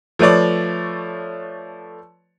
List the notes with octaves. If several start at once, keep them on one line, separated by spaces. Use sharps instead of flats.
F3 A3 B4 C#5 D5